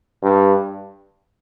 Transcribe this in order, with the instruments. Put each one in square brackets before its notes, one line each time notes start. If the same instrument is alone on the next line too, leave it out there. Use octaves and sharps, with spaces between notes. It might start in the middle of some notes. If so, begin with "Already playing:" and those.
[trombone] G2